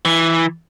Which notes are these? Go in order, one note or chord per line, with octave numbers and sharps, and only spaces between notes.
E3